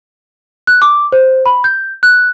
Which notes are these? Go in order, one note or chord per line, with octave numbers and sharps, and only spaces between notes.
F#6
D6
C5
B5
G6
F#6